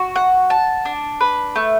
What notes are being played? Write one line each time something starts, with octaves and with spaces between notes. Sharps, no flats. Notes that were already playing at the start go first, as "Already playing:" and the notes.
Already playing: F#4
F#5
A5
D4
B4
A3